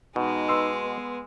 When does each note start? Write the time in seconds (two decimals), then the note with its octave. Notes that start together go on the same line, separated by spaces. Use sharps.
0.16 B2 G#3 D#4
0.49 B4 C6 E6
0.83 B3